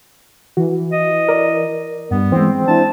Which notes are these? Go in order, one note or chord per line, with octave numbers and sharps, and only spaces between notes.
E3 F#4
D#5
A#4 D5
G2 B3
E3 G#3 C4
D4 E4 A5